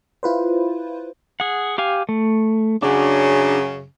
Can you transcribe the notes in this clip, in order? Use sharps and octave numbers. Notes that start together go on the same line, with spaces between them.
E4 F4 B4 C5
G#4 F#5
G4 F5 G#5
A3
F#2 C#3 D4 F#4